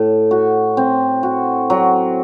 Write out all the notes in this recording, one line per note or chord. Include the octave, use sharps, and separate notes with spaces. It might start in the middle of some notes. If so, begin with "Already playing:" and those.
Already playing: A2
F#4
C4
F#4
F#3